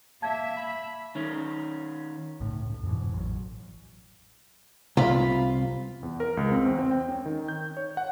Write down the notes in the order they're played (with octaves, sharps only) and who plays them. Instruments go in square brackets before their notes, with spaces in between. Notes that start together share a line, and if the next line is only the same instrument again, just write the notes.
[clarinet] A#3 [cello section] E5 [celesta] A5 G#6
[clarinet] B5
[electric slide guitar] D#3 C#4
[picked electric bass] G1 C#2 A2
F2 G#2 B2 E3
A1 F#3
[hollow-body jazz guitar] C2 [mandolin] F4 B5
[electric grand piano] E2
A#4
C#2
C4
E2
C4
G5
C#4
D#3
G6
C#5
F#5